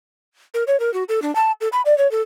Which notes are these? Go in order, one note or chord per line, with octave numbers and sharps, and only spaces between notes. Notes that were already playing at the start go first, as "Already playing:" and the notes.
A#4
C#5
A#4
F#4
A4
D4
A5
A4
B5
D5
C#5
A4